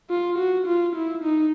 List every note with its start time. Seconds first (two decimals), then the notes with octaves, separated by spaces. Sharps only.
0.10 F4
0.38 F#4
0.67 F4
0.95 E4
1.24 D#4